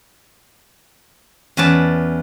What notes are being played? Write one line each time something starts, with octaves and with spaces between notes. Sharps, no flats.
E2 C#4 B4 D5 A5